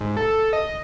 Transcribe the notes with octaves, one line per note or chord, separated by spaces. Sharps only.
G#2
A4
A4
D#5